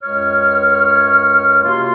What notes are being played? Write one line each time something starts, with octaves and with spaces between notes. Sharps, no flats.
C#2 F#2 C#5 F6
C3 A#3 F4 F#4 C6